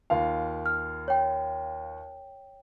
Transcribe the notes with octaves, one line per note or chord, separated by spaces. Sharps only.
D#2 F4 F5
F6
C#5 G5